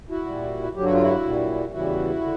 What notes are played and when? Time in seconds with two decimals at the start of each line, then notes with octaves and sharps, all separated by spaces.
0.10 E4 F#4
0.26 A#2 G3
0.75 G2 D3 F#3 G4
0.84 F#4
0.93 F4
1.01 E4 F#4
1.23 A#2 G3
1.72 E2 C#3 E3 G3 E4 F#4
2.21 D3